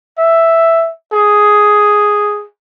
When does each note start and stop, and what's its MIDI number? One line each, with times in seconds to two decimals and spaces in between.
0.18 0.90 76
1.13 2.45 68